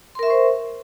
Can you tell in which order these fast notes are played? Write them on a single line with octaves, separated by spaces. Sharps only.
C6 A#4 E5 C#6 C5